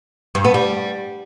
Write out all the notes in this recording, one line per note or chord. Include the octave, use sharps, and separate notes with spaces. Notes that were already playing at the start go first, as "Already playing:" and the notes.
G2
B3
G3